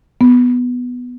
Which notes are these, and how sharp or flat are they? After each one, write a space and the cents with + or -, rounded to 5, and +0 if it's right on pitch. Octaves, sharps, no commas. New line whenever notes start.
B3 +0